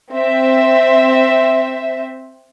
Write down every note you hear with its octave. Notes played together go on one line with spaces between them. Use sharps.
C4 C5 E5